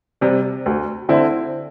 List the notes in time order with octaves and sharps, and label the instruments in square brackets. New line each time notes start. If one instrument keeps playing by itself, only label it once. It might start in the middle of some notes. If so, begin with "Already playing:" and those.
[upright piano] C3 G3
D2
D3 C4 E4